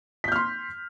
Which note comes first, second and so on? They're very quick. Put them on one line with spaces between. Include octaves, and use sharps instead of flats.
B6 G6 F6 C6